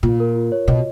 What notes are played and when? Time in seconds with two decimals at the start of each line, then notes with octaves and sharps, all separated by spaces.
0.03 A#2 F4
0.20 A#4
0.35 F4
0.52 C#5
0.68 B2 D#5